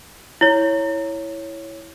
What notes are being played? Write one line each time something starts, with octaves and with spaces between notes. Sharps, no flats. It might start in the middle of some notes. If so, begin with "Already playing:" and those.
E4 C#5